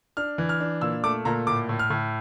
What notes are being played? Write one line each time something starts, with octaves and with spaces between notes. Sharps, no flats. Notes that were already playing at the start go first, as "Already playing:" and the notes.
D4 F6
E3
F6
D4
A#2 E6
A3 D6
A#2 A#5
A2 D6
A2
F6
A2